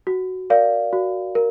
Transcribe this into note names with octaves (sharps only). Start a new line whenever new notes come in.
F#4
A#4 D5 F5
F#4
A#4